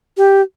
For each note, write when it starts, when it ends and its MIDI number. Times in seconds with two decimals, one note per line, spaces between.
0.17 0.41 67